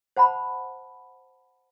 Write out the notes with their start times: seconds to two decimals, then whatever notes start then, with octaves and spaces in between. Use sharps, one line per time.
0.17 C5 F#5 A5 B5